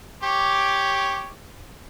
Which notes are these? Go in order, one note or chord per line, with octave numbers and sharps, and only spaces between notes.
G4 C#5 D6